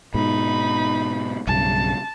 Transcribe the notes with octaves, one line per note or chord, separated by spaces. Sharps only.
G#2 B2 D#4 B5
B1 G2 C#3 A5